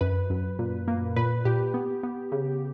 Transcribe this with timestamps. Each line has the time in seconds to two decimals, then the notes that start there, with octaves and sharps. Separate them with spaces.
0.01 F#2 B4
0.30 F#2
0.59 A#2
0.88 A#3
1.16 A#2 B4
1.45 A#2 G4
1.74 B3
2.03 B3
2.32 C#3